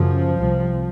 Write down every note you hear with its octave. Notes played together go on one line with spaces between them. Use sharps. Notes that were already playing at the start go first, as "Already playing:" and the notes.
Already playing: F#2 C#3 F3
C2 C3